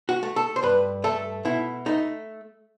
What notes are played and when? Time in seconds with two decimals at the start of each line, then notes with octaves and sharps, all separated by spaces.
0.09 F#4
0.23 A3
0.36 A4
0.56 C5
0.63 G2 B4
1.04 A3 A4
1.45 B2 E4
1.86 A3 D#4